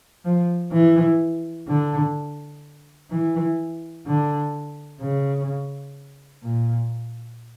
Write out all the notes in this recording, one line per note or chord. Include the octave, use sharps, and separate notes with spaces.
F3
E3
D3
E3
D3
C#3
A#2